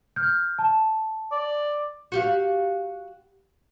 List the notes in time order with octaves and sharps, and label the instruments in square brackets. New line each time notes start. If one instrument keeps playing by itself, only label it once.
[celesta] F6 G6
A5
[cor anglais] D5
[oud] F#4 G4 F5